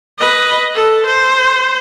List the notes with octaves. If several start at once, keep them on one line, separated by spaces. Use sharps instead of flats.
B4 D#5
A4
C5